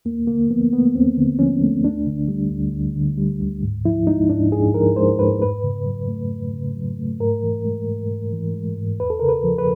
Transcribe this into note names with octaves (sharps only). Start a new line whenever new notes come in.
D#2 A#3
D3 A#3
F3 B3
A3 B3
D#2 C4
D3
F3 C#4
A3
D2 D4
D3
G3
D2
D2
D3
G3
D2
G#2
F3 E4
G#3 D#4
G#2 D4
G#2 G#4
F3 A#4
G#3 C5
G#2 B4
F2 B4
C#3
F#3
A3
F2
C#3
F#3
A3
G#2 A#4
E3
G#3
G#2
G#2
E3
G#3
G#2
E2 B4
A4
C#3 A#4
B4
F3
B4